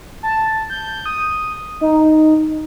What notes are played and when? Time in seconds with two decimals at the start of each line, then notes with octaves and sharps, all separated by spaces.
0.23 A5
0.70 G6
1.06 D#6
1.81 D#4